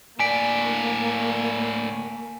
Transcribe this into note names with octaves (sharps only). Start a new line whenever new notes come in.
A2 A#3 D5 G#5 B6 D7